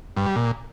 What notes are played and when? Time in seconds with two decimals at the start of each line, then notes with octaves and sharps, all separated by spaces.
0.17 G2
0.26 G3
0.36 A#2